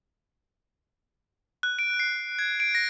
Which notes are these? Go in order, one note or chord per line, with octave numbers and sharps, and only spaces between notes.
F#6
D7
C7
G#6
D7
A#6